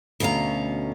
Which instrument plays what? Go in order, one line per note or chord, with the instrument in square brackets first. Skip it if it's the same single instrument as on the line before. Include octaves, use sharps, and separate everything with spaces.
[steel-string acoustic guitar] D2 B2 C#4 F5 A#5